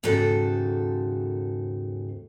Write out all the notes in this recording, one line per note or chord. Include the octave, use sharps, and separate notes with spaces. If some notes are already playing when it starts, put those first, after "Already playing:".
D#2 G#2 C#3 F#4 A4 C5